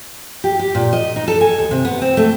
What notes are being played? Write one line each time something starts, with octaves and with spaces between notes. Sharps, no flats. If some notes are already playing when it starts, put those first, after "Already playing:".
G4
G4
A#2
D#5
D#4
A4
G#5
D#2
C3
B3
C4
A3